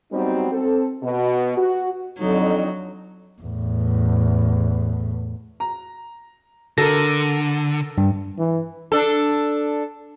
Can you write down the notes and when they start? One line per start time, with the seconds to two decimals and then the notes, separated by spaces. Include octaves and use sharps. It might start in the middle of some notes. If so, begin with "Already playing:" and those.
0.12 F#3 G3 B3 C4 D#4 F#4
0.52 C4 A4
1.03 B2
1.58 F#4
2.19 F2 D3 F#3 D#4
3.42 E2 A2
5.60 A#5
6.78 D3 A4 A#4 A#6
7.98 G2
8.38 E3
8.92 D4 A4